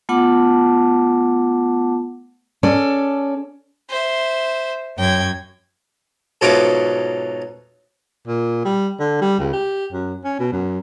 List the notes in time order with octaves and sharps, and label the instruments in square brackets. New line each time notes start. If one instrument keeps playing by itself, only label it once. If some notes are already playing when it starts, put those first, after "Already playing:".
[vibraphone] A3 B3 F4 F#5 A5 D6
[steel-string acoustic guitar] C#4 A4 D5
[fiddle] C5 E5
[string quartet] F#2 G#6 [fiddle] G5
[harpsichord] G#2 B2 F#3 A3 F4 D6
[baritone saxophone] A#2
G3
D3
G3
C#2
G4
F#2
C#4
B2
F#2